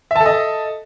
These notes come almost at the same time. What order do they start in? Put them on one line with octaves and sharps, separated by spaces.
E5 A5 A4 D#5